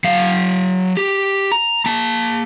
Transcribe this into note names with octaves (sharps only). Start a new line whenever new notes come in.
F#3 F5
G4
A#5
A#3 A5